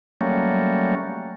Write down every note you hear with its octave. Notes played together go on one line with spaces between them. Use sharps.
F#3 G3 A3 A#3 C#4